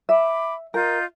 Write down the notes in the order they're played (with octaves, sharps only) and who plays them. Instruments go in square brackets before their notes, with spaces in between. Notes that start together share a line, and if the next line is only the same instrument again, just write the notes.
[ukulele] E5 [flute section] B5 D6
[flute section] F4 D#5 G6 [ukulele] A#4